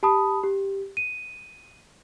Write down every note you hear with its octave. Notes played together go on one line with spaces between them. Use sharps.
G4 A5 B5 D#6
G4
D#7